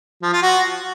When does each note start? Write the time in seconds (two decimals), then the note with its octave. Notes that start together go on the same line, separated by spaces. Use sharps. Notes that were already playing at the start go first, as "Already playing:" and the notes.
0.23 F3
0.33 F4
0.42 F#4